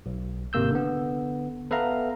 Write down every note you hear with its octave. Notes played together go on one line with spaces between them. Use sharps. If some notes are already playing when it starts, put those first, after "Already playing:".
B1
G#1 C3 A#3 E6 G6
D3 B3
B3 A4 B4 E5 F5 A#5